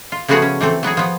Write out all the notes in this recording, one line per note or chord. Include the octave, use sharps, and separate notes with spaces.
F4
C#3 F3 A3 B3 F#4 G#4
C#4
E3 A3 C4 A4
F#3 B3 F#4 G#4
F3 B3